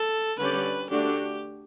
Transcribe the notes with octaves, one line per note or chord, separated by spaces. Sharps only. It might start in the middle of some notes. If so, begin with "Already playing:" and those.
Already playing: A4
D3 G3 C#4 G4 B4 D5
D3 A3 D4 F#4 G4